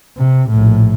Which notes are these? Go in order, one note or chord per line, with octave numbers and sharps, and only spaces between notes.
C3
A#1 A2